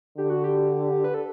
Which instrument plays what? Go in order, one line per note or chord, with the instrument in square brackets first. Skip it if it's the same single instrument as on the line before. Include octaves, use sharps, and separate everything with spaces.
[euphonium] D3 [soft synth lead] G4
[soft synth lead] F#4
G4
B4
A4